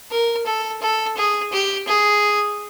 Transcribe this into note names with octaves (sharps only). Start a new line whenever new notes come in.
A#4
A4
A4
G#4
G4
G#4